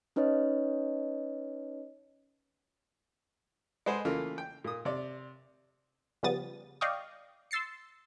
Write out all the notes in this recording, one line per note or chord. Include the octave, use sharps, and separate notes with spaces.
C#4 D#4 B4 C#5 D#5
G#3 G#4 A4 B4 C5 F#5
C#3 E3 A3 A#3 F4
G5
A#2 D#6
C3 D5
C#3 F3 G3 B3 D#6 A6
D5 D#5 F5 G5 C#6 D#6
C6 E6 A6 C7 C#7